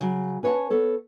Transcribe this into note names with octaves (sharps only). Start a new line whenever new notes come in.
C#3 F#3
C#4 B4 C#5 D5 F#5 A5
B3 A4 C#5